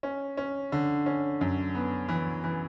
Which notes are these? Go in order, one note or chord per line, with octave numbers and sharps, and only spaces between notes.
C#4
C#4
D3
C#4
F#2
B3
E3
E3